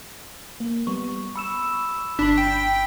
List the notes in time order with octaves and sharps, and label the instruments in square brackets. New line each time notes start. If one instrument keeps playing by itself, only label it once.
[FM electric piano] A#3
[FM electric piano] G3 B3 [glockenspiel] C#6
[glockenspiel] B5 E6 E7 [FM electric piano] C#6
[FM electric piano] G1 B5 [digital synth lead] D4 [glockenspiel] B6 F#7
[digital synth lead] G5 [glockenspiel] B6